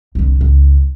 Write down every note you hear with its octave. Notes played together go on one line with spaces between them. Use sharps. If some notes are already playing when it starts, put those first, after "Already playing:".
C2 D3
C#2